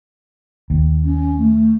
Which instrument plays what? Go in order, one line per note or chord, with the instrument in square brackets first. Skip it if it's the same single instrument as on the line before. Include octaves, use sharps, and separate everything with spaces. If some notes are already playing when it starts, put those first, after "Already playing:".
[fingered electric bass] D#2
[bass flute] C#4
A3